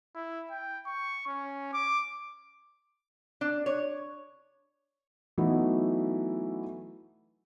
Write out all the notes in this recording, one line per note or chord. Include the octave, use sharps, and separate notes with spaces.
E4
G5
C#6
C#4
D6
D4
C#5
E3 F#3 A3 B3 D#4 E4